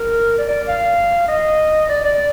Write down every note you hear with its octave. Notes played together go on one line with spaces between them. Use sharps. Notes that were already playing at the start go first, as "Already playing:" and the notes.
Already playing: A#4
D5
D5
F5
D#5
D5
D5